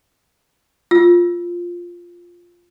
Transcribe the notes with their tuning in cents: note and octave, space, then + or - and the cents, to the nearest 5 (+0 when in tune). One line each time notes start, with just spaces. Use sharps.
F4 +0 E6 +0